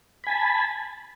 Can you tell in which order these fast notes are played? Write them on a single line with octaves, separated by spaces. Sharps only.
B5 G#5 A5